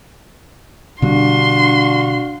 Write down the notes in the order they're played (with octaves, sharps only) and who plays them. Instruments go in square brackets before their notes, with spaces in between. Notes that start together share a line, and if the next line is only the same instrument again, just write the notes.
[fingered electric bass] B2 D3 G3 [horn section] D4 F#4 F5 [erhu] C6